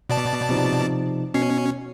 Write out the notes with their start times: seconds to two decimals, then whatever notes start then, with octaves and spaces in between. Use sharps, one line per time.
0.09 B2 D5 A5
0.50 C3 F3 D#4
1.34 B2 C#4 C7